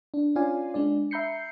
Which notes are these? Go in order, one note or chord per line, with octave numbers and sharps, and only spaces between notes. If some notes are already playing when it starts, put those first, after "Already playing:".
D4
C#4 F4 D5 F5 G#5
G#3 D4 D5
E5 A#5 B5 G6 C7 C#7